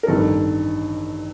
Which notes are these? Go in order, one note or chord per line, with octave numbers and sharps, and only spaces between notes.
A#4
A1 G2 D#3 A4